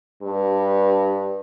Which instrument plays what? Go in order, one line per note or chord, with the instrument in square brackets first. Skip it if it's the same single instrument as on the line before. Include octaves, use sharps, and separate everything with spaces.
[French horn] G2